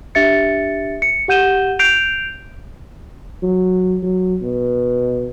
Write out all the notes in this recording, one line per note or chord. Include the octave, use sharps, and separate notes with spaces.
D4 G4 E5 A6 C#7
C#7
G4 F#5 G6 D#7 E7 G7
G6 C7 D7 F7
F#3
F#3
B2